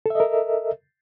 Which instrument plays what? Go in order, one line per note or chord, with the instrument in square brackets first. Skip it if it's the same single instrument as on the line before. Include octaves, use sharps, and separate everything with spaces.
[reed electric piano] A4
E5
D#5
A#4